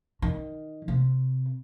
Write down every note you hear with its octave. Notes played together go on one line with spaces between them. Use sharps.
D#3
C3